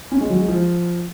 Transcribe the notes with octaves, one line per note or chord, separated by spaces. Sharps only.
C#4
G#3
F#3
G#3
F3